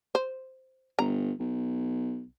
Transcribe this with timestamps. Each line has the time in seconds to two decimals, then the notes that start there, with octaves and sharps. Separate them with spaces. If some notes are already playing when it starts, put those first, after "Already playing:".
0.15 C5
0.99 G1 A#5
1.39 B1